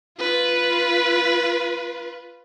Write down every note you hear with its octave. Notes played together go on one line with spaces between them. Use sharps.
F4 B4